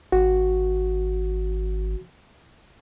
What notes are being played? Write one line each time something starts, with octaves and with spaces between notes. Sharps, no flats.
G#1 F#4